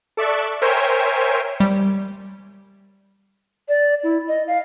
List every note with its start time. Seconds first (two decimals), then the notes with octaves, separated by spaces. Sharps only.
0.17 A4 D5 E5 C#6 F#6
0.62 A#4 C5 C#5 E5 G5 G#5
1.60 G3
3.69 D5
4.04 E4
4.28 D#5
4.47 F5